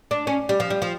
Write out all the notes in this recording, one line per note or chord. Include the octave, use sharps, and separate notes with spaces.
D4
C#4
G3
F3
G3
F3